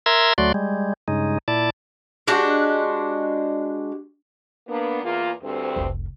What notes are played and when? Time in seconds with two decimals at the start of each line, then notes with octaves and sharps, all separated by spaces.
0.06 A#4 E5 A#5 C6 E6 G#6
0.38 D2 F#3 A3 F#4 D5 C6
0.54 G3 G#3
1.08 G2 C#3 G#3 D#4
1.48 A#2 E4 D5 A5
2.28 G#3 D4 F#4 G4
4.68 A#3 B3 D4
5.04 E2 A#3 F4
5.42 D2 G2 C4
5.76 F1 C2